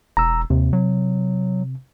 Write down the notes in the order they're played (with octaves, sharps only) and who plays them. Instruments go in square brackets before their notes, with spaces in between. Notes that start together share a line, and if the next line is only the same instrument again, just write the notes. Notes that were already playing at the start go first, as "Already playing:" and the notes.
[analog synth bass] E1 [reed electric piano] A#5 E6
[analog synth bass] D#2 [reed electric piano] C3
[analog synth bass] F#3